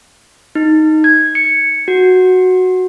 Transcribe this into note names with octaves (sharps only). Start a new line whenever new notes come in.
D#4
G#6
C#7
F#4